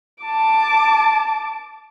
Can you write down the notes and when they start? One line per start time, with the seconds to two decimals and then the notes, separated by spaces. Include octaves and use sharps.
0.24 A5 D6